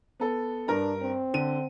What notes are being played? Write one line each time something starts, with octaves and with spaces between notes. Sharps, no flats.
B3 A4
G2 D4 A#4 A#5
C4
D3 D#7